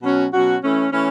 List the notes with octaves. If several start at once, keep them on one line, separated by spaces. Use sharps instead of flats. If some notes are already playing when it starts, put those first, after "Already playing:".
B2 F#3 C#4 F#4
B2 F#3 C#4 F#4
E3 A3 C#4
E3 A3 C#4